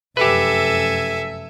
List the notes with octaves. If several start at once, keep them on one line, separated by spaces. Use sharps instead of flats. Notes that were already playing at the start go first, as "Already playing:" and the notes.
F1 F#2 G4 A4 B4 E5 G#5